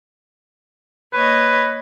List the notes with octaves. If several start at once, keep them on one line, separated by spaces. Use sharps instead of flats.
A#3 B4 C#5 D#5